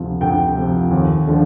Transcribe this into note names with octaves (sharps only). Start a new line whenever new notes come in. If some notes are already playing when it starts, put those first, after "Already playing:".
Already playing: D2 C3 F3
D2 G5
C3 F3
D#2
D3 F3